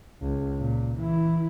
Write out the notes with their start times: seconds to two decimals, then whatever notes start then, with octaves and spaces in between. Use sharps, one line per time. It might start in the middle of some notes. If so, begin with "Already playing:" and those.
0.22 C#2
0.59 A#2
0.97 E3 E4